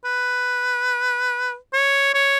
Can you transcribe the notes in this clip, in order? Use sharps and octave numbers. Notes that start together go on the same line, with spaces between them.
B4
C#5
C#5